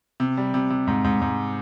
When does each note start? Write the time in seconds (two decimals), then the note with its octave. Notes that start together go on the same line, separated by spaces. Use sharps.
0.20 C3
0.37 G3
0.54 C3
0.70 C3
0.87 G#2
1.04 G#2
1.21 G#2